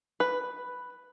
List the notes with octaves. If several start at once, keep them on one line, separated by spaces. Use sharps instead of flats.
B4